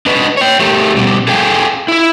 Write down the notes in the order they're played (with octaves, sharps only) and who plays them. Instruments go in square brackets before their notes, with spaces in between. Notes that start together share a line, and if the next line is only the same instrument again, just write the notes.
[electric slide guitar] D4 B4 D#5
C#5 G5
A3 G4 A4 A#4
B2 G3 G4
G#4 A4 F5 G5 G#5
E4 E5